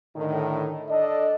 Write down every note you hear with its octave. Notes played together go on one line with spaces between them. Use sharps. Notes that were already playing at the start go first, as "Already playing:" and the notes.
A2 D3 D#3
D4 A4 D5 D#5